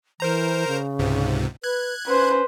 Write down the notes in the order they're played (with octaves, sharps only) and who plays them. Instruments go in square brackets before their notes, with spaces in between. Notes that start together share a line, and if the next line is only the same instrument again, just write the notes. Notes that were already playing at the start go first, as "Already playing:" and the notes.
[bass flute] E3 [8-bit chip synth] A#4 C5 A#5
[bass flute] C#3
[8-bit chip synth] C#2 G#2 C3
[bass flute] B4 [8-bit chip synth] F#6 G#6
[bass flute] C#4 [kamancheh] B4 C5